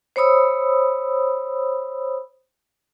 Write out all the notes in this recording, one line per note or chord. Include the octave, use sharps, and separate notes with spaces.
C5 C#5 B5 D#6 E6